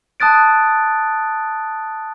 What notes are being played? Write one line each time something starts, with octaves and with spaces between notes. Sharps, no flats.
A5 D#6 F#6 A6 D7